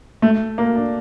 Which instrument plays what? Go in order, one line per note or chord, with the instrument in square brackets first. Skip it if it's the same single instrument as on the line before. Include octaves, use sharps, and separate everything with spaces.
[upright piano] A3
A#3
D4